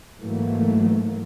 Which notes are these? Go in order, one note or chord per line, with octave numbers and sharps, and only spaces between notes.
G#2 E3 F#3 A3 A#3